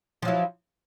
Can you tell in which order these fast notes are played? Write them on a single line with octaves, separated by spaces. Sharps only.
F3 F#3 E4